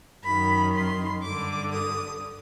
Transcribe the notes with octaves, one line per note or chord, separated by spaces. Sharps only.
F#2 D#3 B5
C6
G2 D3 D6
D#6